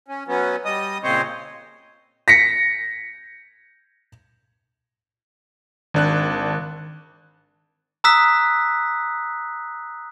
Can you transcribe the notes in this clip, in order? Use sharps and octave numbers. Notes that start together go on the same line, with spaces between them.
C#4
F#3 B3 C#4
G3 D#5 D#6
A#2 C#3 C4 C5 C#5 D#5
A#6 B6 C#7
G#1 D#3 D4 F#6
A#5 D#6 E6 F#6 B6